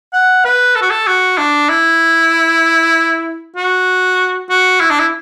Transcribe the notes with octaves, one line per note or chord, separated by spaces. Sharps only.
F#5
B4
A4
F#4
A4
F#4
D4
E4
F#4
F#4
E4
D4
E4